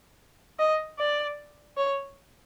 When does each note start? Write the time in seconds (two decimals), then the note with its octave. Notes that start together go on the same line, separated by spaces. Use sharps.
0.59 D#5
0.99 D5
1.77 C#5